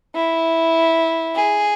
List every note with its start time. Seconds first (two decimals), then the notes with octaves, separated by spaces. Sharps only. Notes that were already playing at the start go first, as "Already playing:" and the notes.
0.15 E4
1.35 G#4